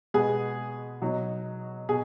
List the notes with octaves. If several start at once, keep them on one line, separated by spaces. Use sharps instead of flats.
B2 G#3 B3 G#4
B2 F#3 D#4
B2 G#4